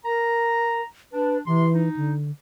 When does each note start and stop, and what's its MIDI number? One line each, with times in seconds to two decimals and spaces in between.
0.05 0.82 70
0.05 0.84 82
1.12 1.39 62
1.12 1.38 71
1.46 1.67 48
1.46 1.89 52
1.46 1.67 84
1.74 2.13 63
1.97 2.31 50